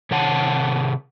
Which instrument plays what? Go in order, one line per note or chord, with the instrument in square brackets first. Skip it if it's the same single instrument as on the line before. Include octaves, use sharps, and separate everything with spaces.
[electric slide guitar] C3 D#3 C#5 F#5 A5